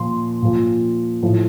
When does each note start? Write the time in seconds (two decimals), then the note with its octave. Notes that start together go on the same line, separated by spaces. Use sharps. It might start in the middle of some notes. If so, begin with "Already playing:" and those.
Already playing: A#2 F3 C6
0.42 A#2 F3
1.22 A2 F3